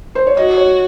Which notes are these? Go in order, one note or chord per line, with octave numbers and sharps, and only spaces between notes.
C5
C#5
F#4 D#5
C#5